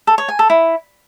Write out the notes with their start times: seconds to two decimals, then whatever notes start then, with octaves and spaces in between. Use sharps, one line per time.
0.07 A4
0.18 C#5
0.28 G#5
0.39 A4
0.50 E4